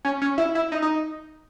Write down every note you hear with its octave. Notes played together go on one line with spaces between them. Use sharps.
C#4
C#4
E4
E4
D#4
D#4